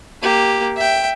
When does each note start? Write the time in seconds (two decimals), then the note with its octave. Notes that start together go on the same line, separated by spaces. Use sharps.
0.22 A#3 G4
0.77 E5 G5